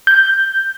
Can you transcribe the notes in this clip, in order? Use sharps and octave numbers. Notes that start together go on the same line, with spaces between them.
G6